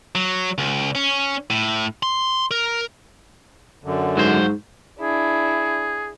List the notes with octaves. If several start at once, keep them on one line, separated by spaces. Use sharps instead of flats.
F#3
C#2
C#4
A2
C6
A#4
F#2 D3
G#2 F#3 C5
D4 E4 G#4